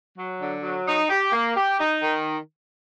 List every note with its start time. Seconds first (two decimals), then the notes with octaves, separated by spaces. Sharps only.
0.16 F#3
0.40 D3
0.62 F#3
0.86 D#4
1.08 G4
1.33 A#3
1.56 G4
1.78 D#4
2.02 D#3